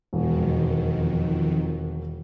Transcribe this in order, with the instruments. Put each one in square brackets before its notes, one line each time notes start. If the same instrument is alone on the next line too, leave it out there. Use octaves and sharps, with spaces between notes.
[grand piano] E1 [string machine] F2 D#3